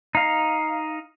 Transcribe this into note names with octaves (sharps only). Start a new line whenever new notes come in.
D#4 F5